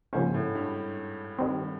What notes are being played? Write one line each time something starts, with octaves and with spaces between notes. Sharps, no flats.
G#2 C#3 F3 A#3 C#4
A2
G2
D#3 G3 C4